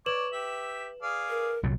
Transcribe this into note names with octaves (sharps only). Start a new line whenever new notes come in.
B4 C#5 D5 E7 F#7
G4 E5
G#4 D5 F5
A#4
C2 A#2 F#3